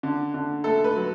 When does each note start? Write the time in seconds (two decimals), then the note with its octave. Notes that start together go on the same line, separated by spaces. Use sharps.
0.03 D3
0.34 D3
0.64 A3 A4
0.84 B4
0.96 F#3